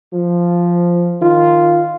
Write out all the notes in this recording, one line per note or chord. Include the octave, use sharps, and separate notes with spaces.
F3
D#3 F4